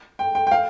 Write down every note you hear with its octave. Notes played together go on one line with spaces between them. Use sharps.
G5
G5
G5
F5